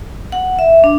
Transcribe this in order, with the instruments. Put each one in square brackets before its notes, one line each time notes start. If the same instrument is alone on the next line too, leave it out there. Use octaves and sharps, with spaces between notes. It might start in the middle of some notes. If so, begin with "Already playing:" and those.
[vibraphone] F#5
E5
D4